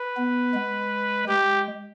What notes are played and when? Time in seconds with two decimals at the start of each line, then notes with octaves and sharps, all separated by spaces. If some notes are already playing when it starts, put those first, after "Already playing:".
Already playing: B4
0.17 B3
0.54 G#3
1.28 G#3 G4